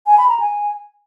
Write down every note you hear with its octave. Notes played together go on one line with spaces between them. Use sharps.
G#5
B5
A#5
G#5